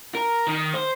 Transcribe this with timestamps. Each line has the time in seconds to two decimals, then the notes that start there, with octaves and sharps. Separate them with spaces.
0.15 A#4
0.48 D#3
0.74 C5